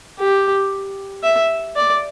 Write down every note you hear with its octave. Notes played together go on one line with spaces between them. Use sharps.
G4
E5
D5